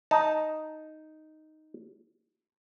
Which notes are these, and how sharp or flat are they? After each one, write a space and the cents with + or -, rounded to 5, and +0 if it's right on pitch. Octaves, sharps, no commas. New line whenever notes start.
D#4 +0 A5 +0